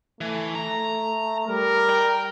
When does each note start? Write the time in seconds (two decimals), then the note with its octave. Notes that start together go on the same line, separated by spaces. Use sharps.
0.21 E3 A3
0.55 A#5
1.48 G3 A#4
1.90 G5